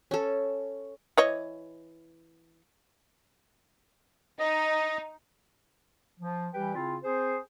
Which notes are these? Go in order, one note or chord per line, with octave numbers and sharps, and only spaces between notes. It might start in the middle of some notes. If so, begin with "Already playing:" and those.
C#4 A4
E3 C#5 D#5
D#4 D#5
F3
E3 G3 G4 B4 G5
C#3 C4 E4 F4
C4 G#4 C5